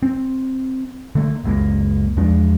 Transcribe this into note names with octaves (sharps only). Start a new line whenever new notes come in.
C4
D3 A3 A#3
F#1 C#2 G#3 A#3
E2 F3 G#3 D4